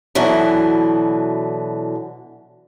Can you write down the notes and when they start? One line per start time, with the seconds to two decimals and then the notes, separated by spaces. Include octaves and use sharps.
0.15 B2 D3 E3 F#3